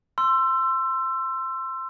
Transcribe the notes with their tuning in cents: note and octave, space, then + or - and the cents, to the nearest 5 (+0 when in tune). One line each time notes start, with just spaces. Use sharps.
C6 +0 E6 +25